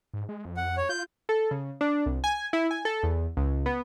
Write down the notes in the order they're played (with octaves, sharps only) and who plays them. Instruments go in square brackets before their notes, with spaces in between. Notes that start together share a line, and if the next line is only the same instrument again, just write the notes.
[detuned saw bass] G#2
G#3
F2
[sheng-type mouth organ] F#5
C#5
[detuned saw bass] F4 [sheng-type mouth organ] G6
[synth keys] A4
C#3
D4
C2
G#5
E4
G#5
A4
E2
C#2
B3